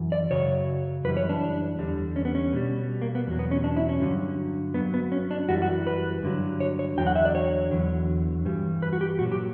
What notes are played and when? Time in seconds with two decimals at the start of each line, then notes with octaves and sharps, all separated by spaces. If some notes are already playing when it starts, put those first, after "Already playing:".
Already playing: F#2 E3
0.12 D5
0.31 F#2 C#3 F#3 C#5
1.05 F#2 E3 G3 B4
1.17 C#5
1.29 D4
1.79 E2 D3 G3
2.16 C#4
2.25 B3
2.35 C#4
2.53 B2 G3
3.02 A#3
3.15 B3
3.27 E2 B2 F#3
3.39 B3
3.51 C#4
3.64 D4
3.77 E4
3.89 C#4
4.00 G2 D3 F#3
4.74 G2 F#3 B3
4.94 B3
5.12 C#4
5.31 D4
5.49 F#2 E3 G3 F#4
5.62 F#4
5.87 B4
6.23 G2 D3 F#3
6.60 C#5
6.79 C#5
6.97 E2 D3 F#3 G5
7.07 F#5
7.16 E5
7.25 D5
7.35 C#5
7.71 E2 D3 F#3
8.45 G2 E3 G3
8.82 B4
8.93 F#4
9.01 G4
9.19 A#2 F#3 F#4
9.32 G4